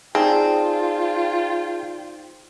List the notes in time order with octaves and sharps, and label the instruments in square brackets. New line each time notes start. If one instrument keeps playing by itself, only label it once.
[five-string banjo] C4 [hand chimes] D#4 C5 D5 [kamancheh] F4 G5 [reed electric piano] G#4 A5